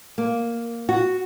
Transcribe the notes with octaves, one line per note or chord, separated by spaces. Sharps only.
A#3
F#4